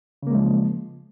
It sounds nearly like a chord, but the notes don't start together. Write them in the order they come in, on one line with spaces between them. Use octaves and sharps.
C#3 A#3 G#3 F3